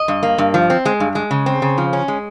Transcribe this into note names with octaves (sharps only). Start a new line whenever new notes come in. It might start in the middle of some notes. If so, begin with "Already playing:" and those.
Already playing: D#5
G2
A#3
G2
F3
C4
G#3
G2
G#3
C#3
C4
C#3
F3
C#4
G#3